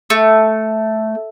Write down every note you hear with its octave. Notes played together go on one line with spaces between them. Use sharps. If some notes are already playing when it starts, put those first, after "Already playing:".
A3